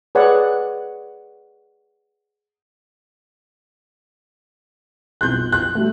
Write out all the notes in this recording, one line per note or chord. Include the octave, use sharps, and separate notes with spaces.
G#4 B4 C#5 D5 F#5
B1 F2 F#6 G6
F#6
F#3 G3 A3